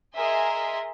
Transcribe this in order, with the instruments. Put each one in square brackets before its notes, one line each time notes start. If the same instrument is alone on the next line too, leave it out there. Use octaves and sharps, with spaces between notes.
[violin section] G#4 A#4 D#5 E5 G#5 C6